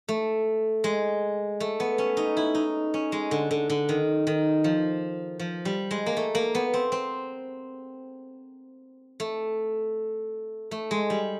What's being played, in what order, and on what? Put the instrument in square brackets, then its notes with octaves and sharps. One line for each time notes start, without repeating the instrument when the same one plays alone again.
[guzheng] A3
G#3
A3
B3
C#4
D#4
E4
D#4
C#4
G#3
D3
D3
D3
D#3
D#3
F3
F3
G3
G#3
A#3
A3
A#3
B3
C4
C4
A3
A3
G#3
G3